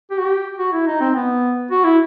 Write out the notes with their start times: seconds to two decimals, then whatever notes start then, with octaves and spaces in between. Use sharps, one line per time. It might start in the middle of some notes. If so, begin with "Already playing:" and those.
0.11 G4
0.19 F#4
0.26 G4
0.59 F#4
0.73 E4
0.87 D#4
1.01 C4
1.15 B3
1.71 F#4
1.84 E4